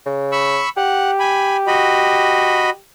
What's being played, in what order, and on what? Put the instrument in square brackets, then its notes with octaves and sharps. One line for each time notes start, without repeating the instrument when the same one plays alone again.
[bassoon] C#3
[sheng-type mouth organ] B5 C#6 E6
[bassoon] G4 [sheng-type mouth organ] F#5
[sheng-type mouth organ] G#5 B5
F#4 D#5 B5